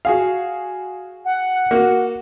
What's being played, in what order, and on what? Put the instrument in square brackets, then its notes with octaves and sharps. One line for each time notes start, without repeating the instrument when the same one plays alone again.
[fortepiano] F#4 G#4 F5
[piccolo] F#5
[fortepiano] A#3 F#4